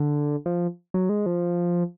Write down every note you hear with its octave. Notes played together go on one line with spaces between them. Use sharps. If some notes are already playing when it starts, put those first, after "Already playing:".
Already playing: D3
F3
F#3
G#3
F3